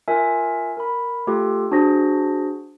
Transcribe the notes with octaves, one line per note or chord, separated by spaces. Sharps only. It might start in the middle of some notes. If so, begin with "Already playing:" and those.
F4 A#4 E5 G#5
A#4 B5
A3 F4 G4 A4
D4 F#4 G#4 C5 A#6